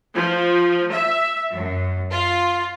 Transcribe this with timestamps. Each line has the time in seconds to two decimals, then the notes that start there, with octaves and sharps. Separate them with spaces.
0.15 F3
0.93 E5
1.53 F#2
2.11 F4